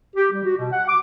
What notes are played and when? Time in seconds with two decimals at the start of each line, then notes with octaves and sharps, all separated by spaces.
0.16 G4
0.31 G3
0.43 F#4
0.57 B2
0.71 F#5
0.88 D6